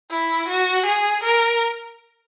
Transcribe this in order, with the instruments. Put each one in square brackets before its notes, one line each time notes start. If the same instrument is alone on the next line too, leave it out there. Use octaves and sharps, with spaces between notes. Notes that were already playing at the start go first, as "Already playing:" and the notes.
[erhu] E4
F#4
G#4
A#4